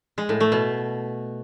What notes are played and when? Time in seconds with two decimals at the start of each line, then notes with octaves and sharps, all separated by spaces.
0.18 G#3
0.29 A2
0.40 A3
0.52 B2